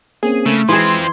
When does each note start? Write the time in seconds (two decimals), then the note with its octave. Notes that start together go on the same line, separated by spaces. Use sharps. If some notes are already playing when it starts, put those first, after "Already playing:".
0.23 A#3 C4 C#4 G#4
0.46 C#3 A3
0.69 E3 F3 G#3 C4 G#4 C6